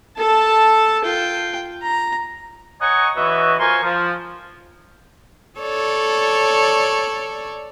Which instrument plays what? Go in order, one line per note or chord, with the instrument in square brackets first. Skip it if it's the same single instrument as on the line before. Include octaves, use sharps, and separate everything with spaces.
[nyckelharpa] A4 A5
F4 G5
A#5
[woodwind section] C#5 D#5 F#5 G#5 A#5 C#6
E3 F#4 B4 C#5 D#5 E5
F4 A#4 C5 G#5 C6 C#6
F3
[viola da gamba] A4 C#5 D5